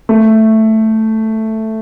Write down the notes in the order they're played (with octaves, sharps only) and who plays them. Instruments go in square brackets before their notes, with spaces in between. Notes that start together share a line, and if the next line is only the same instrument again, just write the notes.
[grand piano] A3